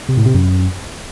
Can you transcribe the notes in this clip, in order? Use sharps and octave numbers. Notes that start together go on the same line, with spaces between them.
C3
A2
C3
F#2